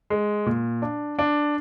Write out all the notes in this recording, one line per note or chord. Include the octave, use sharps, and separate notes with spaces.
G#3
A#2
D4
D4